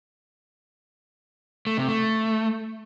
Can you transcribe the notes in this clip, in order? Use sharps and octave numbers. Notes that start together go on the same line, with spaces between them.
A3
C3
A3